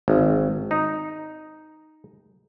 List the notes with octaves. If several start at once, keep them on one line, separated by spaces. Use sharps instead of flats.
G#1
D#4